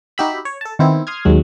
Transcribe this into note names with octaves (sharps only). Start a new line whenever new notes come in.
D#4 F#4 G4 E5 B5
C#5
A4 A5
D#3 B3 C4 E4
C6 D#6 F6 G#6
D#2 F#3 G#3